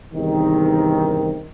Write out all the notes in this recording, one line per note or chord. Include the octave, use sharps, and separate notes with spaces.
E2 G2 C3 D#3